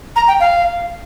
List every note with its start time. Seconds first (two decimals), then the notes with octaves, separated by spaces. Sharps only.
0.16 A#5
0.28 G5
0.40 F5